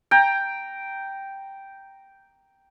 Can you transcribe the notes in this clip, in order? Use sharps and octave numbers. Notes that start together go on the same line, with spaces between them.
G5 A#5